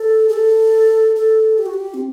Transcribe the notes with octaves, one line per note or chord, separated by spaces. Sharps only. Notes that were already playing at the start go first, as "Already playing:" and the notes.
Already playing: A4
G#4
A4
A4
G4
F#4
G4
C4